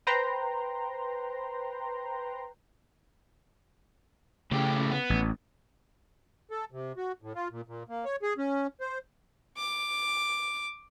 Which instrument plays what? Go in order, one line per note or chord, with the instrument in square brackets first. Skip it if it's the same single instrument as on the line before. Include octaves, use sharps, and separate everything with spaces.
[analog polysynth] B4 C5 G5 A#5 C6
[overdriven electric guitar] A2 G4 [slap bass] C#3
[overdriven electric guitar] B3
[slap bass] A1
[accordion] A4
C3
F#4
A2
F4
A#2
A#2
A#3
C#5
G#4
C#4
C5
[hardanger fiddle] D6